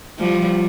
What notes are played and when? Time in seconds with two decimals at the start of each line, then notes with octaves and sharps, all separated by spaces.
0.19 F3 G3